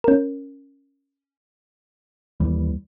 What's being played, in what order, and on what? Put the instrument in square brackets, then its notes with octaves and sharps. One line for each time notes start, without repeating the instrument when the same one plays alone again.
[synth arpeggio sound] C#4 A#4
[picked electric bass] D#2 E3 G3